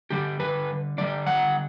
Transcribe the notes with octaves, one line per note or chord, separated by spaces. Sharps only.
D3 G3 G4
B4
D3 G3 D5
F#5